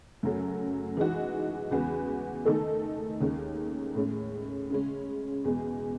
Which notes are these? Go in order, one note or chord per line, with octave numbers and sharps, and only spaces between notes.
F#2 C#3 F#3 A3
E3 G#3 D#4 F#4
E2 C#3 G#3 B3 F#4
D#3 A3 D#4 A4
D#2 D#3 G#3 C#4
A2 G#3 C#4
C#3 G#3 C#4
E2 B2 G#3